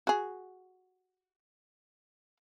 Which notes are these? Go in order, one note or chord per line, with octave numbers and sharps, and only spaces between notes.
F#4 G#4